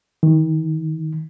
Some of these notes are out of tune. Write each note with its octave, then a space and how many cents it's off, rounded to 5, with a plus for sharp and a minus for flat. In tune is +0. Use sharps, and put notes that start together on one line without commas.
D#3 +35